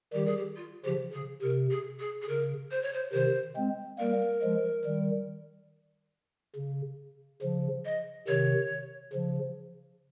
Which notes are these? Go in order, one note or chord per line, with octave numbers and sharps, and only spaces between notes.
D#3 G3 G4
G#4
G4
F4
C#3 F3 G4
C#3 G#4
C3 A#4
G#4
G#4
G#4
C#3 A#4
C5
C#5
C5
C3 D#3 C5
G#3 C4
G3 A#3 A#4
F3 G#3
D#3 G3
C#3
C#3 F3
D#5
C3 D#3 C#5
C#3 F3